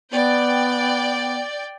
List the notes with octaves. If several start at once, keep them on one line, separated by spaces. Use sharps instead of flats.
B3 D5 G5